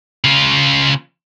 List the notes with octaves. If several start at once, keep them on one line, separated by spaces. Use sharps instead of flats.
C#3 F4